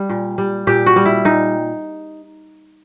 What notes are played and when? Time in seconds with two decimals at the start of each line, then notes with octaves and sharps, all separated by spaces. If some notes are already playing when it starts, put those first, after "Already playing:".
Already playing: G3
0.09 A#2
0.38 G3
0.67 A#2 G4
0.86 F#4
0.96 G3
1.05 E4
1.25 A#2 D#4